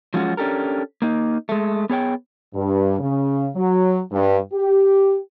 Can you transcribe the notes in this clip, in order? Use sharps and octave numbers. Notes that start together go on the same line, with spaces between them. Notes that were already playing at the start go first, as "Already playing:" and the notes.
F3 F#3 G#3 C#4 F4 F#4
C#4 D4 G4 A4 A#4
A#3 D#4
G#3 A3
B3 G#4 C#5 G5
G2
C#3
F#3
G2
G4